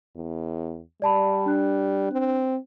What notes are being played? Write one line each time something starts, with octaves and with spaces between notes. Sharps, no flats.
E2
G3 D5 A5 B5
D4 F#6
C4